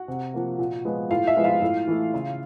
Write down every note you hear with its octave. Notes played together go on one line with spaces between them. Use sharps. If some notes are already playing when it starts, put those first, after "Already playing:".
Already playing: F#4 F#5
C3
F3 A#3
A#2
F3 G#3 B3
A2 F4 F5
E5
F3 G#3 B3
F4 F5
A2
E3 A3
C#3